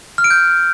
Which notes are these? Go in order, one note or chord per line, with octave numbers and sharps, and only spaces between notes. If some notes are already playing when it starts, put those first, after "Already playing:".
F6
D7
G6